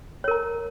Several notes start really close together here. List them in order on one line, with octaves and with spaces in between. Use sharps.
C#5 A#4 A#5